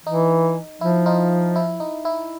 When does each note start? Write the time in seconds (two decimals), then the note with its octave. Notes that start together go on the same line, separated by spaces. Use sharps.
0.06 E3 D#4
0.81 F3 E4
1.06 D#4 F4
1.56 E4
1.80 D#4
2.05 E4